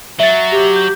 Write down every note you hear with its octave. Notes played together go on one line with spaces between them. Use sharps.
F#3 E5 A6
G4
G6